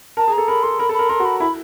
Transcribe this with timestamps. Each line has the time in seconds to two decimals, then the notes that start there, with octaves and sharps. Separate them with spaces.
0.17 A#4 A5
0.28 G#4
0.33 A#5
0.38 A4
0.48 A#4 B5
0.63 A4 C6
0.79 A#4 B5
0.89 A4
0.94 A#4 B5
1.09 A#4 C6
1.20 F#4
1.25 B5
1.40 E4 B5